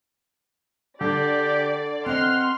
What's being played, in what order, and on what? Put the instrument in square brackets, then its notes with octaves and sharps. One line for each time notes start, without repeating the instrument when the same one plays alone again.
[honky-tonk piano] D3 [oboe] G4 [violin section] D5
[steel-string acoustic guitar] C4 D#5 [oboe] F#5 [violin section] C6 F6